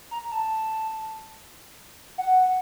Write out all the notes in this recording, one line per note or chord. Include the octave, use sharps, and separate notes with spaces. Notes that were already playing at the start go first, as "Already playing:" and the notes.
A#5
A5
F#5